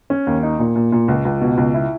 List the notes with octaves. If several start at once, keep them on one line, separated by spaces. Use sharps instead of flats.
C#4
D#2
D#4
A#2
A#2
A#2
C#2
C#2
B2
C#2
E4